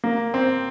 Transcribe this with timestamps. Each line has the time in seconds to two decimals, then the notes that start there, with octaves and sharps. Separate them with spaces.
0.04 A#3
0.34 C4